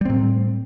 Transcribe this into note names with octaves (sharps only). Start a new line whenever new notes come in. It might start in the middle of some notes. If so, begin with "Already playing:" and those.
A2 G3 C4